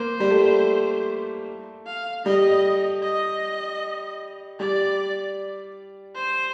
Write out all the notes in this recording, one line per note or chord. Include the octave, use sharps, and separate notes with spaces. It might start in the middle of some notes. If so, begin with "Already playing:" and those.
Already playing: A#3 C5
G3
A3
F5
G3 D#5
D#5
G3 D5
C5